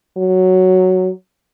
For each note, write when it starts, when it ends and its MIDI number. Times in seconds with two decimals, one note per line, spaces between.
0.17 1.10 54